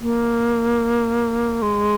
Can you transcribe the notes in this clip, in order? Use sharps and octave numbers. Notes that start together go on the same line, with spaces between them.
A#3
G#3